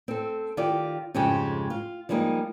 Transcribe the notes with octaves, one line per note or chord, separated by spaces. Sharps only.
C4 A4
D#3 F4 G4 C5 D5
F2 G#2 C#3 G#3 G4 C5
F4
F3 G3 G#3 A#3 D#4